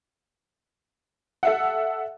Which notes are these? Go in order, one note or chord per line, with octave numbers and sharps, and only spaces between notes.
A4 E5 F#5